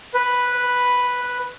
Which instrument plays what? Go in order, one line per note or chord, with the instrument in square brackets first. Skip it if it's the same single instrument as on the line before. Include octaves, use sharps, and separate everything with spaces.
[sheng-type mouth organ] B4